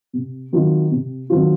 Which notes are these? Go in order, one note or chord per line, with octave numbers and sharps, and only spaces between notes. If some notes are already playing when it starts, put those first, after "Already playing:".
C3
D#3 F#3 C4 F4
C3
D#3 F#3 C4 F4